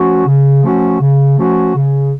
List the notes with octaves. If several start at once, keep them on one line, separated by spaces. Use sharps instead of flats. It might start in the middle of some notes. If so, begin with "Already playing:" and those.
Already playing: F3 A3 C#4 F#4
C#3
F3 A3 C#4 F#4
C#3
F3 A3 C#4 F#4
C#3